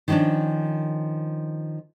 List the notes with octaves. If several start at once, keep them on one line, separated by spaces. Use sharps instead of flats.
D#3 F3 G3 C#4 D4